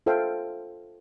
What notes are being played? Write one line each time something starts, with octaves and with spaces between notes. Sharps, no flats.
F4 A4 C5 E5 F5 G5